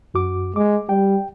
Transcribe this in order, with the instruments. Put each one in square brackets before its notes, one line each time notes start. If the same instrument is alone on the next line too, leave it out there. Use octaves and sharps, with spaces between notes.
[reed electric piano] F#2 F#4 D6
[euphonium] G#3 [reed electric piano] D6
[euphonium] G3 [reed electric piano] G5